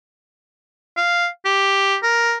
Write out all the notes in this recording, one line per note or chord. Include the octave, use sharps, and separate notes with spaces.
F5
G4
A#4